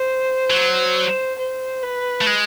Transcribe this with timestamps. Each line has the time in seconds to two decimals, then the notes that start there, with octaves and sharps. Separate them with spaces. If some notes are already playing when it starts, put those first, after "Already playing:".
Already playing: C5
0.50 F#3
1.38 C5
1.83 B4
2.21 A3
2.27 G#3